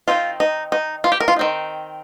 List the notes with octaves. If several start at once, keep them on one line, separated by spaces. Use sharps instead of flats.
D#3 C4 D#4 F4
D#4
D#4
F4
G4
A#4
F4
D#3 C4 D#4